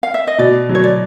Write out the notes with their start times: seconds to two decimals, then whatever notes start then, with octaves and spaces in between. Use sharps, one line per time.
0.03 F5
0.14 E5
0.27 D#5
0.38 B2 D5
0.69 F#3
0.75 C#5
0.84 D5